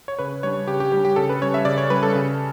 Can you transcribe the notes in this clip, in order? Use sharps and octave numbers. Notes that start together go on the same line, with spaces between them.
C#5
C#3 B4
G3 D4 C#5
C#3 G4
G4
G3 D4 G4
G4
C#3 A4
B4
G3 C#4 C#5
E5
C#3 D5
C#5
G3 C#4 B4
A4
C#3